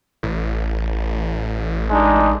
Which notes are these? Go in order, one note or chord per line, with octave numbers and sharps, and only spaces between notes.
A1
G#3 D4 D#4